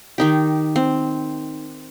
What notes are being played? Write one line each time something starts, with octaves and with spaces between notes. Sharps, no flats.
D#3 D#4 G4
C4